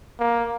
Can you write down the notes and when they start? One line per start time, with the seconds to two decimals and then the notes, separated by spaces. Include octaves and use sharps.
0.20 A#3